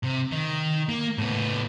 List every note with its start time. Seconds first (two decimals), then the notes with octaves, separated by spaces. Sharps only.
0.04 C3
0.32 D#3
0.89 A#3
1.18 A2 B3